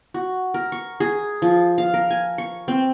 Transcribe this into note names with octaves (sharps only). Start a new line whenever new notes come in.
F#4
A#4
C#6
G#4
F3
F5
A#4
G#5
C#6
C4